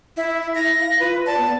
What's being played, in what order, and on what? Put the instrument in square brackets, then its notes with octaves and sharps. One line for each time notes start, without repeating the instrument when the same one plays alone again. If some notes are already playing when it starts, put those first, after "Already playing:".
[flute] E4
[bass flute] E4 [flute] A#6
[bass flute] F5
[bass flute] F4 [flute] B4
[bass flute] D5 [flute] A5
[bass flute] B3